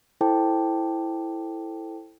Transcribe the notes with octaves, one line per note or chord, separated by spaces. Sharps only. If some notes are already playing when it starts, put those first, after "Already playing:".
E4 A4 C5 G5 A5 D6